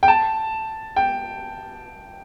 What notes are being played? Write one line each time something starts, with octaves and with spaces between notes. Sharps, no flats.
G5
A5
G5